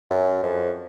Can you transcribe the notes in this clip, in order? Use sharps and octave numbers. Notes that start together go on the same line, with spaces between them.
F#2
F2